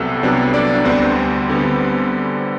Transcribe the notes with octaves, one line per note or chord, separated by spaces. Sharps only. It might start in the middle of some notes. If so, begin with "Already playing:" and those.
Already playing: C2 C3 F#3 A3 B3 A4
C2 C3 F#3 B3 D4 D5
D4 D5
D2 D3 G3 B3 C4 C5
D3 G3 B3